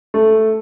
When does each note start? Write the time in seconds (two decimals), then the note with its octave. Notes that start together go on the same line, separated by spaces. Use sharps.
0.14 A3